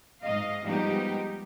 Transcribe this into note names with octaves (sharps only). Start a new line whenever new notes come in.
G#2 D#5 F5
F3 G3 G#3 B3 D#4 G4